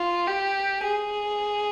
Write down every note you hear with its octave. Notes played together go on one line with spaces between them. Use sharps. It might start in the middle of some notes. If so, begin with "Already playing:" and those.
Already playing: F4
G4
G#4